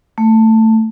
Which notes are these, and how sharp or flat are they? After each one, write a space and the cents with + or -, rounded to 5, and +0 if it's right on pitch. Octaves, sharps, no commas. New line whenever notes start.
A3 +15